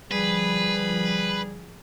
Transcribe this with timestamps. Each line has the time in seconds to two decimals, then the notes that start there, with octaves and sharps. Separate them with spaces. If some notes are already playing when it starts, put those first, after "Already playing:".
0.11 D3 F3 G3 G#4 B4